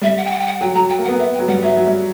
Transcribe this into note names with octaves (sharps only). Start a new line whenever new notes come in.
G3 E5
F#5
G5
F#5
G5
F#5
F#3 G5
F#3 A#5
G5
A#3
F#5
B3
E5
G5
F#3
G3 F#5
F#3 E5
F#3
G3